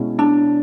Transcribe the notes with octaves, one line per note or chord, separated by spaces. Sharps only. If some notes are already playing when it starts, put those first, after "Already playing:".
Already playing: B2 G#3 C#4 E4
D4